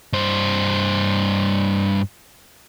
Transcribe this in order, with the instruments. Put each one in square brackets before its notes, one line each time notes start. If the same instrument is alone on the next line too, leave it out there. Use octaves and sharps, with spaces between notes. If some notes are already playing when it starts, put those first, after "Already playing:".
[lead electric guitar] G2 C5